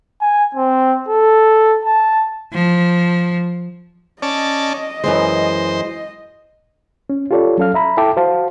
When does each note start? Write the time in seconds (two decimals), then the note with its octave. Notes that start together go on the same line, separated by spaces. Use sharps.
0.21 G#5
0.55 C4
1.08 A4
1.85 A5
2.53 F3
4.22 C#4 D5 D#5 A5
5.04 F#2 E3 G#3 C5
7.10 C#4
7.31 F4 G4 A4 C#5 D5
7.58 F#3 C#4 A4 F5 F6
7.74 E5 A#5 B5
7.97 E4 A4 E5 G5 A5 D6
8.17 F#4 C5 F5 A5